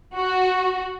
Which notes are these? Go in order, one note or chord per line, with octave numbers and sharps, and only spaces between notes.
F#4